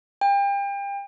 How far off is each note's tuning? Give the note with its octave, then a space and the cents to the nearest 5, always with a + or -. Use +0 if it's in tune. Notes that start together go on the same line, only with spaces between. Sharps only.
G5 +35